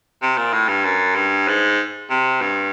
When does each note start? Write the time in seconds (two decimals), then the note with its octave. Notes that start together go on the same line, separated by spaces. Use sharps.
0.22 C3
0.37 A#2
0.53 A2
0.68 G2
0.85 F#2
1.15 G2
1.48 G#2
2.10 C3
2.41 G2